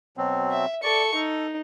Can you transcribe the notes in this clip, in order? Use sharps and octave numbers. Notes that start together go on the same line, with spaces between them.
B2 F#3 C4
E5
A4 D5 C#6
D#4 A4